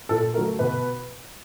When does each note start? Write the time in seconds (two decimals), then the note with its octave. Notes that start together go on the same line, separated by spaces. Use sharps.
0.09 A#2 A4
0.34 F#3 A3 A#4
0.59 B2 B4